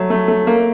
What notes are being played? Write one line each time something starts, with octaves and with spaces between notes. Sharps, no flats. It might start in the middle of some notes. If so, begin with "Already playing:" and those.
Already playing: F#3 A3
A3
A3
A#3